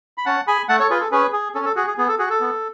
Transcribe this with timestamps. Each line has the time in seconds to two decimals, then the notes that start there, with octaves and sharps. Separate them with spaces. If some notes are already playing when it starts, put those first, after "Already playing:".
0.18 B5
0.26 C#4 F#5 A5
0.47 G#4 G#5 B5
0.68 A3 F#5 A5
0.80 A4 C#5
0.90 F4 G#4 B4
1.01 A4
1.12 C#4 G#4 B4
1.33 G#4
1.55 C#4 A4
1.65 A4
1.76 F#4 G#4
1.87 G#4
1.98 B3 G#4
2.08 A4
2.19 F#4 G#4
2.30 A4
2.40 B3